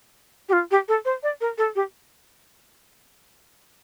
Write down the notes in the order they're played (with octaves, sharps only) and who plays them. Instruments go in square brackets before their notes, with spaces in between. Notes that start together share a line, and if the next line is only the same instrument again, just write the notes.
[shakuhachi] G4
F4
G4
A4
C5
D5
A#4
A4
G4